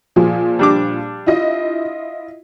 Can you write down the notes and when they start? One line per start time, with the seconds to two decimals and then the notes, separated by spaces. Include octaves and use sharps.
0.16 A#2 F3 G#4
0.59 G3 D4 D6
1.27 E4 F4 D#5